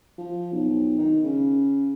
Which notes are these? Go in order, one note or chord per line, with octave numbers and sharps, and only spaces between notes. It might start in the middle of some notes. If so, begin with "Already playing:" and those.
F3
B1
D#3
C#3